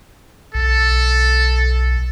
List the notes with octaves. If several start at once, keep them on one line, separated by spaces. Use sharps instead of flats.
B1 A4